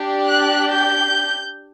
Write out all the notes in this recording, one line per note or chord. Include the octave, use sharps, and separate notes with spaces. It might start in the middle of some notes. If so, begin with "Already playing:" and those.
Already playing: D4 G4
F#6
G6